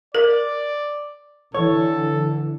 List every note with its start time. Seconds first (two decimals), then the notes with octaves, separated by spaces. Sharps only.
0.15 A#4 D5
1.55 D3 E3 A4 C#5